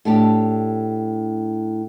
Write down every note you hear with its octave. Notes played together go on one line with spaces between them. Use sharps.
A2 D4 G4